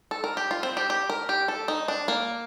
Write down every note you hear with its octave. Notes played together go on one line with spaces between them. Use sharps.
A4
A#4
G4
F4
C4
G4
G4
A#4
G4
A4
D#4
D4
A#3